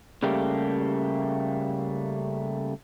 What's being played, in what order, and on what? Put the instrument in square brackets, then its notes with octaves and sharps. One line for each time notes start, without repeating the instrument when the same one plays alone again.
[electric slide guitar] C#3 G3 A3 A#3 G4